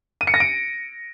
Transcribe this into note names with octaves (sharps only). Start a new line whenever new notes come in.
D#7
C#7
A#6
D7